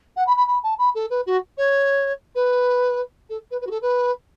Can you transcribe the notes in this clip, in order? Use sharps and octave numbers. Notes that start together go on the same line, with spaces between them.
F#5
B5
B5
B5
A5
B5
A4
B4
F#4
C#5
B4
A4
B4
B4
F#4
A4
B4